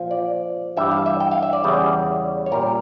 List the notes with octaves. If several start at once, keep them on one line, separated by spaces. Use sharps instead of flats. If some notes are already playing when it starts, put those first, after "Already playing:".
Already playing: A#2 F3
D5
G2 E3 G3 E5
F5
E5
G5
F5
E5
D5
E2 C#3 E3 G3
C#5
A#2 G3 A#4